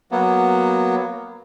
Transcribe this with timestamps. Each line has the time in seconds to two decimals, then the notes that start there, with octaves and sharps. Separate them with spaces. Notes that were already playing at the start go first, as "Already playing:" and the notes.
0.12 F#3 A#3 B3